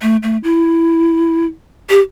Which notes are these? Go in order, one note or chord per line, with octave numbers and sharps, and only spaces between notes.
A3
A3
E4
G4